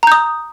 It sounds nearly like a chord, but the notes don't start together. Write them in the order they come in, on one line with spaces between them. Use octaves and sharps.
A#5 G6 D#6